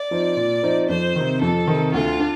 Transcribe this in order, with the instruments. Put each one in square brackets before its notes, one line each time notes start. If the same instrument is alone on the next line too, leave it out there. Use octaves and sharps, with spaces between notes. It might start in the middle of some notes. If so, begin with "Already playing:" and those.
Already playing: [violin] D5
[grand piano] F3 C4 D#4
A#2
F3 C4 D#4
[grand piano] F2 [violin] C5
[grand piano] C3 D#3
[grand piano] F2 [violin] A4
[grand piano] C3 D#3
[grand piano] D2 [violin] F4
[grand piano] D4